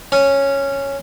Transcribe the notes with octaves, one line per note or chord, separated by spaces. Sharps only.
C#4